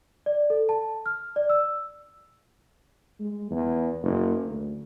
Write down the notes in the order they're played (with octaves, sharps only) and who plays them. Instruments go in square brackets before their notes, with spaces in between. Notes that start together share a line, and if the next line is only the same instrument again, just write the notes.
[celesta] D5
A4
A5
F6
D5
E6
[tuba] G#3
E2
F#1
D2